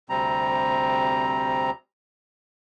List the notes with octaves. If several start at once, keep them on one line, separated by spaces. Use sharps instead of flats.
D2 C3 G3 C4 A#5